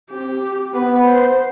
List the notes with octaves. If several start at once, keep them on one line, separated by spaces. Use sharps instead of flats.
C4 G4
B3 B4
C5